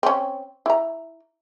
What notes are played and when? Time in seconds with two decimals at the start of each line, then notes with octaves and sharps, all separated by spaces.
0.03 C4 C#4
0.66 E4 A#5